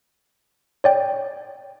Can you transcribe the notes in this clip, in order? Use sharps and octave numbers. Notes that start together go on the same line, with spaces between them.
C#5 D5 G5